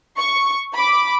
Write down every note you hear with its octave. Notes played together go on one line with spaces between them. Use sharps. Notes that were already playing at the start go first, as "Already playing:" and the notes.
C#6
B5 D6